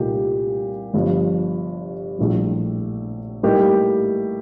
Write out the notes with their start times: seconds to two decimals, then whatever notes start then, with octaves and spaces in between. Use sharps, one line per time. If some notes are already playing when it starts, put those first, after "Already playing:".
Already playing: C2 A#2 A3 D#4 G4
0.94 G1 G2 F3
2.19 A#1 A2 G3
3.43 A2 G3 A#3 D#4 G4